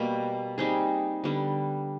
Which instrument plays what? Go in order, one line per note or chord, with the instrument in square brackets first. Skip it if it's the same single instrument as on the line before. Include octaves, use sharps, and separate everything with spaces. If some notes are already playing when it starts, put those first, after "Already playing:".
Already playing: [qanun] B2 G3 A#3
G3 C4 D#4 G#4
D3 G3 B3